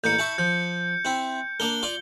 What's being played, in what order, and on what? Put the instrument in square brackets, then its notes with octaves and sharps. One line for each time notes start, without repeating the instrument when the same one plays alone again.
[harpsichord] A1 A#3 [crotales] G6 C#7
[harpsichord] E4 A5 C#6
[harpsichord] F3 [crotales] G6
[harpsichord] C4 E4
[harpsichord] A#3 D4 A#4 [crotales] G7
[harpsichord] F4 D5